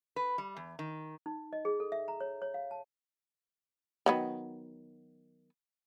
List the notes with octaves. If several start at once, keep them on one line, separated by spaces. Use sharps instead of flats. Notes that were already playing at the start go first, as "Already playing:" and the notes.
B4
G3
E2
D#3
D#4
D#5
G#4
A4
E5
A#5
C#5
C#5
F5
A5
D#3 F#3 B3